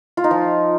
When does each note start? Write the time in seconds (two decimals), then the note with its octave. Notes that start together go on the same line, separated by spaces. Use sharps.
0.17 F4
0.24 D#4
0.31 F3